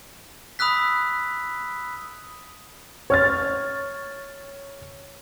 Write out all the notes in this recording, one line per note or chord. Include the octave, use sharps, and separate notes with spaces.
B5 D#6 E6 F#6 B6
C#5 F6 A6